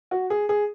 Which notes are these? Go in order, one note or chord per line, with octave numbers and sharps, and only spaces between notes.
F#4
G#4
G#4